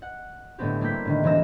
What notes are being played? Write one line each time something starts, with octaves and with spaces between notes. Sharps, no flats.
F#5
A2 D3 A3 B3 C4 G4
G3 A#3 E4 G6 B6
A2 D3 D#3
E1 E3 C4 G#4 A#5 E6